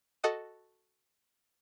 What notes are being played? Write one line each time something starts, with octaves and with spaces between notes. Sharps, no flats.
F#4 A4 D#5 F#5 D#6